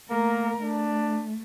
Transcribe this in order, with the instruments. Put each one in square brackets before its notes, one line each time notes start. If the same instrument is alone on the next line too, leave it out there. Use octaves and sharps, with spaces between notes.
[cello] A3 A#4 [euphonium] A#3
[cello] A3 [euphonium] D4